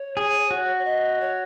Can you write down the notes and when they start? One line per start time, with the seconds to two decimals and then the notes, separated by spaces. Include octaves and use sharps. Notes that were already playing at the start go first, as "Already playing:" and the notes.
Already playing: C#5
0.17 G#4
0.51 F#4
0.78 C#5
0.85 D#5
1.20 C#5